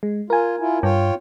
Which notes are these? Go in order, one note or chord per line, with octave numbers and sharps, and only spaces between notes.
G#3
F4 A#4 G#5
E4 F4
G2 F4 C#5 G5